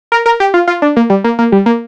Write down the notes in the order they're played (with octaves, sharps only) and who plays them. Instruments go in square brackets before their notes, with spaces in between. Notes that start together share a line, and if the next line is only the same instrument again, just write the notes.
[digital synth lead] A#4
A#4
G4
F4
F4
D4
A#3
G3
A#3
A#3
G3
A#3